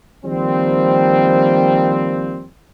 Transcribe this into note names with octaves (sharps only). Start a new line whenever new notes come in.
D#3 F3 G3 A#3 C4